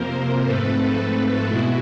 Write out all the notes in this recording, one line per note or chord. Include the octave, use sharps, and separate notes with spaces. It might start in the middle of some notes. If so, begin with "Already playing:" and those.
Already playing: F2 C3 F3 A#3 A#4 C5
G#2 F3 A3 C4 A4 B4
B2 G#3 B3 E4 F#4